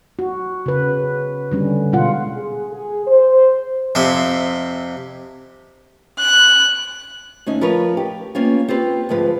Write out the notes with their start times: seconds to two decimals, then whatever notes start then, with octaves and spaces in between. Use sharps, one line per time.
0.19 F#4
0.66 C#3 B4
1.52 D3 G3 C#4
1.92 B2 G#3 F4 F#5
2.32 G#4
2.71 G#4
3.06 C5
3.95 F2 C3 E4 C6
6.19 F#6
7.46 D2 C#4 D#4
7.61 F3 A#4 B4 C#5
7.97 G4
8.35 A#3 B3 C#4 F4
8.68 C4 F4 G4 B4
9.09 D2 G#2 F3 B4